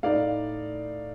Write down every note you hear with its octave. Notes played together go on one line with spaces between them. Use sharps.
A2 A3 D#4 D5 F5